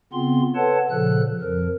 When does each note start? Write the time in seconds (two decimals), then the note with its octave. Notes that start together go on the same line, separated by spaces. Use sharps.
0.13 C#3 B3 C4 F4 C6
0.56 A4 B4 C#5 F#5 A5
0.90 A#2 C#3 F3 A4 F#6
1.41 F2 F3 A#4